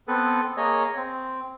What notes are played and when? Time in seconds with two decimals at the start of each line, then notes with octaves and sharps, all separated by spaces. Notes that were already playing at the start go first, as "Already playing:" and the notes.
0.08 B3 C4 A4 B4
0.57 A#3 G#4 C#5 D#5
0.97 C4